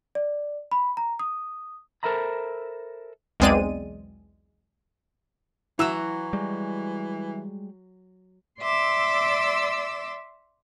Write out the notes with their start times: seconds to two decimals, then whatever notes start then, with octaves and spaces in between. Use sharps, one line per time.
0.15 D5
0.71 B5
0.97 A#5
1.19 D#6
2.03 A4 A#4 C5 E5 A#5 B5
3.40 B1 E2 G#3 C4 D5 D#7
5.79 E3 F#3 E4 F#4 E6
6.33 G3 G#3
8.61 D5 E5 C6 D6 E6